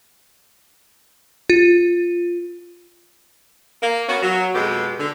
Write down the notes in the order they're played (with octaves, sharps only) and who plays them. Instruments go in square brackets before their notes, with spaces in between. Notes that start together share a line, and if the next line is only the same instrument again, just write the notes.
[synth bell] F4
[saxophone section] A#3
B3 C#4 F#4
F#3
F2 B2 G#3 B3 G4 A4
D3